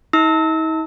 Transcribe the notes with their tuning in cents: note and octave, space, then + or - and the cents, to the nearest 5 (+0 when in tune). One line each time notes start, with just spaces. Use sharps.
D#4 +45 E6 -30